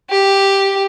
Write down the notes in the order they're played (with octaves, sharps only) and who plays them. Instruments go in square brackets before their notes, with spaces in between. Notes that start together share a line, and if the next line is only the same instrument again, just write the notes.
[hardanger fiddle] G4